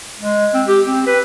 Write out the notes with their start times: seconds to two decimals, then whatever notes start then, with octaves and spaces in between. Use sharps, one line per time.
0.20 G#3
0.54 C4
0.68 G4
0.86 C4
1.07 B4